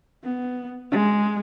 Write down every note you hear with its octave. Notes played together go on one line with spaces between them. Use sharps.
B3
G#3